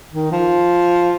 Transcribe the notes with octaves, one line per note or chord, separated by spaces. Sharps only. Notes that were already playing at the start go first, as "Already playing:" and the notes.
D#3
F3